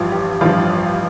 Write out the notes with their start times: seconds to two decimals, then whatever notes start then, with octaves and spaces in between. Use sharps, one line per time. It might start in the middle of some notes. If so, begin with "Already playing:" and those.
Already playing: A1 G2 F3 F4
0.12 G4
0.41 A1 G2 F3 F4